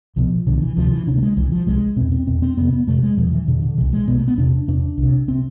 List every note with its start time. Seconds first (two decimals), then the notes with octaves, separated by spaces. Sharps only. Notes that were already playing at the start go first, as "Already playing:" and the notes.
0.16 C2 B2 F3
0.47 C2 B2 D3
0.62 E3
0.77 D2 C3 F3
0.92 E3
1.07 D2 C3 D4
1.18 A3
1.22 G#3
1.37 C2 C3 E3
1.52 F3
1.67 C2 C3 G#3
1.96 E2 B2 C4
2.12 C4
2.27 E2 B2 C4
2.42 C4
2.57 F2 C3 B3
2.73 B3
2.87 F2 C3 A3
3.03 G#3
3.17 E2 B2 F3
3.33 E3
3.47 E2 B2 D3
3.63 D3
3.78 C2 B2 E3
3.93 G#3
4.08 C2 B2 B3
4.17 A3
4.28 B3
4.38 E2 C3 D4
4.68 E2 C3 D4
4.98 C2
5.03 C3
5.28 C3 C4